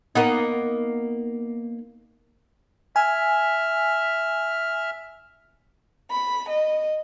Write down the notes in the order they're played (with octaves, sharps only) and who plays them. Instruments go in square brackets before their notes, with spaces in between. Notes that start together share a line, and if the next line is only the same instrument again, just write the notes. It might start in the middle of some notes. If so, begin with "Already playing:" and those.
[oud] A#3 B3 D#4
[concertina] E5 F6 [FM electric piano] G#5
[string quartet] B5
D#5